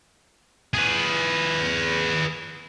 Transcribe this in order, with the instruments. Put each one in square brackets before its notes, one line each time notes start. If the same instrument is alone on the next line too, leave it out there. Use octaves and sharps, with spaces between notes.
[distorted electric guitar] G#4 B4